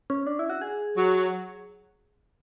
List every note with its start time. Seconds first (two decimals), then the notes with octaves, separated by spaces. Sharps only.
0.10 C#4
0.27 D4
0.39 E4
0.50 F#4
0.61 G#4
0.97 F#3